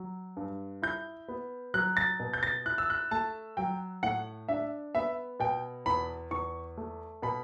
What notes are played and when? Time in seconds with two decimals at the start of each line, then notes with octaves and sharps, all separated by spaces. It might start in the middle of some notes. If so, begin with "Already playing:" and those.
Already playing: F#3
0.37 G2
0.82 E4 G6
1.28 B3
1.74 F#3 F#6
1.97 A6
2.20 B2
2.34 G6
2.43 A6
2.66 E4 F#6
2.78 E6
2.90 F#6
3.11 A3 A5
3.57 F#3 G5
4.03 A2 F#5
4.48 D4 E5
4.95 B3 E5
5.40 B2 G5
5.86 E2 B5
6.31 E2 C#6
6.77 A3
7.22 B2 B5